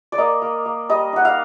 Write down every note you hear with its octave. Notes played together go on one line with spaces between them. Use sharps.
D5
A#3 D#5
A#3
A#3
G3 D#5
D#4 F#5
F5